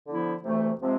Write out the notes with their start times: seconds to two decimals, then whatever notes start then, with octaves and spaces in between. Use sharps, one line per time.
0.06 D3 F3 B3 E4
0.43 D2 C3 E3 A3
0.80 C3 F3 G#3 C4